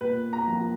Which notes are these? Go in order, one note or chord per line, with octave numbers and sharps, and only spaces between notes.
A#2 B4
A#5
F3 A#3